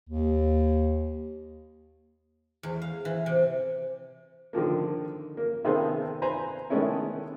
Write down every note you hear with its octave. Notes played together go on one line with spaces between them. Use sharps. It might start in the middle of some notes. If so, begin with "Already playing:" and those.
D#2
E2
F5
E3
C3
D3 D#3 F3 A#3
A#3
C3 D#3 B3 G#4 A4 C5
B4 C5 G#5 A#5
D#3 G#3 A3 B3 C#4 E4